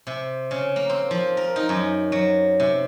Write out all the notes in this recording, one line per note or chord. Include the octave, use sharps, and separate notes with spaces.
C3
C#3
A#3
C4
F3
A#4
D#4
F#2
F#3
C3